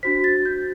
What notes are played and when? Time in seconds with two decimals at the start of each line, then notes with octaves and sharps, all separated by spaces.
0.03 D4 F#4 C5 B6
0.24 A6
0.45 G6